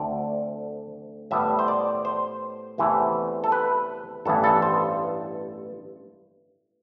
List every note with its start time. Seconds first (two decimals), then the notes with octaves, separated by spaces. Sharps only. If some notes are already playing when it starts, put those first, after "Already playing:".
Already playing: D2 D3 A3 C4 D5
1.31 A2 G3 B3 E5
1.59 C5
1.68 D5
2.05 C5
2.78 E2 C3 E3 A3
3.44 A4
3.52 B4
4.26 A1 G2 E3 B3 A4
4.44 A4
4.62 C5